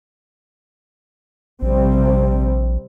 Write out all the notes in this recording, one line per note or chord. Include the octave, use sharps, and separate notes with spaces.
A#1 C3 G3 C4